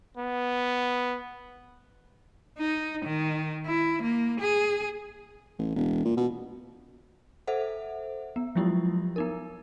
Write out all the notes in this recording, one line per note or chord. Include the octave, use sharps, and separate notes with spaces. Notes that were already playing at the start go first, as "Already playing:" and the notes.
B3
D#4
D#3
E4
A#3
G#4
A1
E1
A#2
B2
A4 C5 E5 F#5
B3
F3 F#3 G#3 E4 F4 G4
B3 D#4 A#4